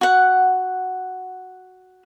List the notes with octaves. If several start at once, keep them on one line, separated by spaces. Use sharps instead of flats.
F#4 F#5